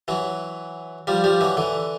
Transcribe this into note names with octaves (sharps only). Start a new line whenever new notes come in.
E3 F#3
F3 G3
F3 G3
E3 F#3
D3 E3